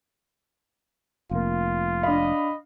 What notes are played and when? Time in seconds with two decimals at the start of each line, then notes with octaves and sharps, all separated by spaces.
1.31 F1 A#3 F4
2.03 D4 D#5 F5 B5